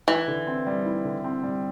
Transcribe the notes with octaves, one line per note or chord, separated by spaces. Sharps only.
E3 E4
D3
C4
G3
E4
D3
C4
G3